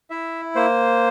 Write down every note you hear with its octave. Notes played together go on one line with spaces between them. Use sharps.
E4 E5
A#3 C5